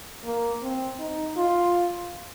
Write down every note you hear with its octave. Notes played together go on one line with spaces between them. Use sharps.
A#3
C4
D#4
F4